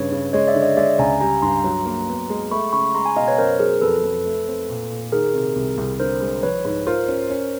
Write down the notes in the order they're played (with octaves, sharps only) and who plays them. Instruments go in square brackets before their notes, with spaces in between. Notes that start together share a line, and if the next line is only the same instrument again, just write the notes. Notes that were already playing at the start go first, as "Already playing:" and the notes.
Already playing: [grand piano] G2 C#3 [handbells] B4 C#5
[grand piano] C#3
[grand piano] G#3 [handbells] C#5 D#5
[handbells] D5 E5
[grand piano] D3
[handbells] C#5 D#5
[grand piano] G#3 [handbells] D5 E5
[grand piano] C#2 [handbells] G#5 A#5
[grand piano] G3 [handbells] G#5 A#5
[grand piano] G2 [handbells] A#5 C6
[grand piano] F#3
A#3
B3
G#3
[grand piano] A3 [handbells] B5 C#6
[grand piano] C#3 [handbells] B5 C#6
[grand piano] G#3 [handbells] A#5 C6
[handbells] G#5 A#5
[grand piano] B2 [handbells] D#5 F5
[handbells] B4 C#5
[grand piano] F#2 [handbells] A#4 C5
[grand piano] F#3 [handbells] G#4 A#4
[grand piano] F2 [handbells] A4 B4
[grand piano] F2
A3
C4
A#2
A#2
[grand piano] D#3 [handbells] G#4 A#4
[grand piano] C3
C2
C2
[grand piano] D3 [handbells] A#4 C5
[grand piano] G#3
[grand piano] F3 [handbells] B4 C#5
[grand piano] G#2
[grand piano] F4 [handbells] A#4 C5
[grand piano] C#4
C#4